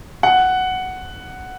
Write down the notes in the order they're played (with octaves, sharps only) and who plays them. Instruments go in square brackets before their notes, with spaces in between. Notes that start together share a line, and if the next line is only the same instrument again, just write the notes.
[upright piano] F#5